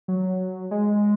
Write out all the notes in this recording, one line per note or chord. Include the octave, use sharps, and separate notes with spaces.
F#3
G#3